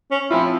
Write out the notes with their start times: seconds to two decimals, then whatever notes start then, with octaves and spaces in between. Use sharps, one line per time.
0.11 C#4
0.31 F3 C4 E4 F4